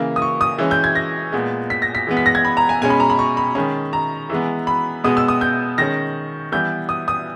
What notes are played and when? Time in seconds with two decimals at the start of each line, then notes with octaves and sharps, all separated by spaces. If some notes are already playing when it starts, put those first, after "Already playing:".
Already playing: C#3 E3 A#3
0.16 D#6
0.22 C#6
0.41 D#6
0.58 E3 G#3 C#4
0.71 G6
0.84 G#6
0.95 A#6
1.32 A#2 G#3 B3
1.70 B6
1.82 A#6
1.95 B6
2.07 E3 G#3 B3
2.17 B6
2.26 A#6
2.35 G#6
2.45 B5
2.57 A#5
2.69 G#5
2.82 B2 G#3 C#4 G#5
2.90 B5
3.00 A#5
3.10 B5
3.19 C#6
3.37 B5
3.55 D#3 G#3 C#4 B5
3.93 A#5
4.30 E3 G#3 B3
4.67 B5
5.04 B2 G#3 B3 D#6
5.17 E6
5.28 D#6
5.41 G6
5.78 D#3 G#3 C#4 A#6
6.52 E3 G3 B3 G6
6.89 D#6
7.08 D#6